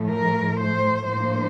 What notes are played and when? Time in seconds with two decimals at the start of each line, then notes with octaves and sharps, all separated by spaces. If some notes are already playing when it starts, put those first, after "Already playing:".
Already playing: A2 F3 A3
0.09 A#4
0.60 C5
1.12 A2 F3 A#3 D4 C5